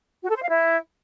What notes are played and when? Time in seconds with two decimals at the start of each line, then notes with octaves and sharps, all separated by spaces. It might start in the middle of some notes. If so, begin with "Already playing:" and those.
0.23 F#4
0.29 A4
0.36 C5
0.42 F5
0.49 E4